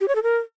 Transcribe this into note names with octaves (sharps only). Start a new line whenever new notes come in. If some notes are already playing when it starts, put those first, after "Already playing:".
G4
C#5
A4
A#4